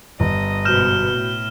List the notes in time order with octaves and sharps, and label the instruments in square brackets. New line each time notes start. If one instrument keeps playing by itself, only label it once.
[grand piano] G1 [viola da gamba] D#5
[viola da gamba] G#2 B2 [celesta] F#4 G6 [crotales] F6 E7
[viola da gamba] A2